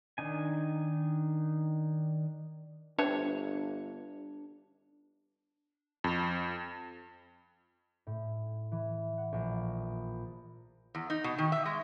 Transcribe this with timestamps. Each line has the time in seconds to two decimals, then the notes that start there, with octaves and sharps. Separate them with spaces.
0.18 D#3 D4 D#4 G#5
2.99 G1 C4 D4 B4 C#5 E5
6.04 F2
8.07 A2
8.72 E3
9.18 F#5
9.33 A#1
9.72 D#6
10.95 E2
11.10 D#4
11.24 B2
11.38 D#3
11.52 E5
11.66 G#3